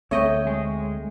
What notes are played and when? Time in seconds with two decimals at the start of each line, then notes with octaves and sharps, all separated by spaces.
0.11 D2 A3 C4 C#5 D#5 G5
0.47 G#3 G#4